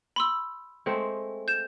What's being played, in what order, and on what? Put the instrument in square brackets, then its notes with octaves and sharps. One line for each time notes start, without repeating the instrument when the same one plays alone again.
[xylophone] B5 C6 E6
[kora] G#3 A3 C4
[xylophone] G6 E7